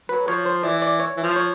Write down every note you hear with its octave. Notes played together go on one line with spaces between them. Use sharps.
F#3 B4
F3 C#5
C5
E3 D5
D5
C#5
E3
F3
C#5